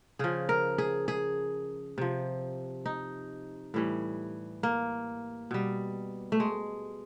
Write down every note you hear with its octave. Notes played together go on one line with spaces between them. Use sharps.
C#3 F3 G#4
A#4
G#4
G#4
C3 F3
D#4
A2 E3 G3
A#3
B2 G3
A3
G#3